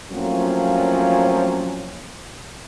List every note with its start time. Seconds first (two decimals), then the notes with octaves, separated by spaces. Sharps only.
0.12 A2 F3 F#3 A#3 C4 C#4